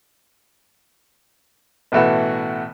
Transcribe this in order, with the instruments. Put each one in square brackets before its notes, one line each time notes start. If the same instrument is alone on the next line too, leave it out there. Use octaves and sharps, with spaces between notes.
[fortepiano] A1 B2 E3 A3 F#4